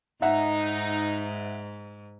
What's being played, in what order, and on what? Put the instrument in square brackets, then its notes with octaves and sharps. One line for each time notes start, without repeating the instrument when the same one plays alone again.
[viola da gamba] G#2 [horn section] D#4 [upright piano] E5 F#5